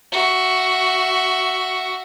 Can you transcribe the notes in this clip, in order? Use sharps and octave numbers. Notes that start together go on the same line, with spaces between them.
F#4 E5